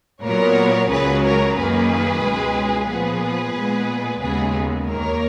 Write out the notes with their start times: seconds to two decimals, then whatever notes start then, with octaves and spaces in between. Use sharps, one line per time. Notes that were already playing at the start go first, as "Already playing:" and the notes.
0.23 A#2 F#3 B3 A#4 C#5
0.90 C#2 C#3 F#3 G#4 B4
1.24 A#4 C#5
1.56 F#2 D#3 A#3 G#4 B4
2.23 C#2 B2 G#3
2.89 A#2 F3 B3 G#4 B4
3.55 A#2 G#3 B3
4.21 D#2 C#3 G#3 B3 G#4 B4
4.88 D#2 D#3 A#3 A#4 C#5